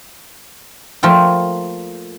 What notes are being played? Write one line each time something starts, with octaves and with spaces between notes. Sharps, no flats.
F3 A3 A#3 F4 G5